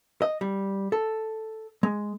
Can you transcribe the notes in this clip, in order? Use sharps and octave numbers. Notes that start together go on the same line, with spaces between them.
D#5
G3
A4
G#3